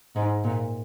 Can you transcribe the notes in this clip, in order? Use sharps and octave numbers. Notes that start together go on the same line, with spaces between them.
G#2
A#2